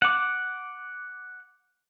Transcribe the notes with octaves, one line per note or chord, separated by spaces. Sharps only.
F#5 D6